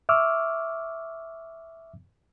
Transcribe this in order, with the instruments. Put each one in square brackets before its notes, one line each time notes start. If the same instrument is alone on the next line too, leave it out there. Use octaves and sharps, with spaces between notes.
[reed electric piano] E5 C#6 D6 E6 F6